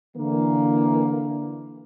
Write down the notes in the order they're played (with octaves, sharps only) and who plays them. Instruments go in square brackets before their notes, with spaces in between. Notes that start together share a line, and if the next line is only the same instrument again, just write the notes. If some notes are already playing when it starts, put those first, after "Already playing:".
[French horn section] D3 E3 A#3